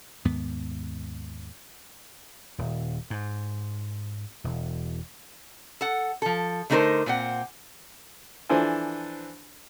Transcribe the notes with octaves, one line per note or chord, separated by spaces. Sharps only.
D#2 G#2 B3
D#1
G#2
E1
A4 F#5
F3 A4
D3 A3 D#4 G4 A#4 C5
A#2 C4 F#5
E3 F3 D4 A4 C5 G#5